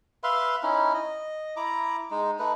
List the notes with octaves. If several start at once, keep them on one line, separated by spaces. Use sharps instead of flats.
B4 E5 F5 C6
C#4 D#4 E4
D#5
E4 A#5 D6
G#3 D#4
A3 D#4 B4